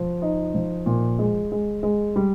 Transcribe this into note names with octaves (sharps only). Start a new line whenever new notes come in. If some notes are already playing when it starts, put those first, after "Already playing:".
Already playing: F3
D#4
F3
A#2
G#3
G#3
G#3
G3